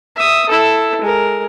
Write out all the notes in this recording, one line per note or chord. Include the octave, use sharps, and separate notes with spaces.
E5 D#6
E4 A4
G#3 A#4